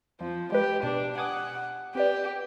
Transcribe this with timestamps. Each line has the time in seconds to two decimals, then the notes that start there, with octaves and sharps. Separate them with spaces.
0.21 F2 F3
0.52 G#3 G4 B4
0.83 B2 D4
1.18 F#5 G#5 D6 D#6
1.95 C4 G4 B4 D5